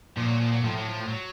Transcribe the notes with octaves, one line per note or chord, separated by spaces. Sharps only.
A#2 F3
F#3
F3
F#3
A2 F3
F#3
F3
F#3